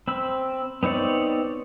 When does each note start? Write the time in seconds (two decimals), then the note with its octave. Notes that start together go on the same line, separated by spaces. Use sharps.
0.08 C4 B5 E6
0.83 B3 C4 D#4 C#5 D5